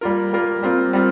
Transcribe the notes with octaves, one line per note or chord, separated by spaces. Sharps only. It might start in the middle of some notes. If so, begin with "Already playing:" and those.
G3 A#3 F4 A#4
G3 A#3 F4 A#4
G3 C4 F4 A#4
G3 C4 F4